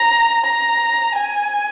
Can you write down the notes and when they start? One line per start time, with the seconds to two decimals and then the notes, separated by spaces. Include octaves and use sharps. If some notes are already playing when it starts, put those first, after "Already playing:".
Already playing: A#5
0.45 A#5
1.16 G#5